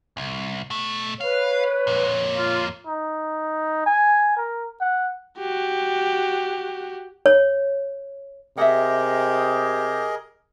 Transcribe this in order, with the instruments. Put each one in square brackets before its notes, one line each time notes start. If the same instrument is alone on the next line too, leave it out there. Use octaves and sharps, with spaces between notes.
[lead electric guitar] C2
B2 A3
[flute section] B4 [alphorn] C#5 [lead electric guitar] F5
[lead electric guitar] F2 A#2
[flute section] F4
[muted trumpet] D#4
G#5
A#4
F#5
[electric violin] F#4 G4
[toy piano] C#5
[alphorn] C3 [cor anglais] G4 [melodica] G#4 A#4 D#5 [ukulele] E5 F#5